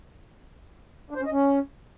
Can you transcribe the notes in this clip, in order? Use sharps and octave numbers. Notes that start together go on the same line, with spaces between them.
D4
C5
C#4
D#5
C#4